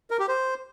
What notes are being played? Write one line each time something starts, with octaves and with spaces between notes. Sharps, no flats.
A#4
G4
C5